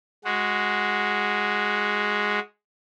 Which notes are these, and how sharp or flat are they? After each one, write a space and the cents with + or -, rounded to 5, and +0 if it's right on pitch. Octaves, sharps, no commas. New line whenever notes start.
G#3 +0 F#4 +0